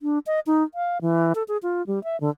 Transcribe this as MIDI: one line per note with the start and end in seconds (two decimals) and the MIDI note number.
0.02 0.19 62
0.27 0.40 75
0.46 0.63 63
0.74 0.98 77
1.01 1.33 52
1.35 1.43 69
1.48 1.57 68
1.63 1.85 65
1.87 2.02 55
2.04 2.19 76
2.20 2.30 50